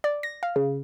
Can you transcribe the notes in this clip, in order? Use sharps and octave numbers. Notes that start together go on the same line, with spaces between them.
D5
A#6
F5
C#3